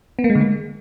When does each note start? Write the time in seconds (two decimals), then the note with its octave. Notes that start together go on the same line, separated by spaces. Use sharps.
0.19 B3
0.24 A#3
0.30 G#3
0.35 D3
0.41 G#3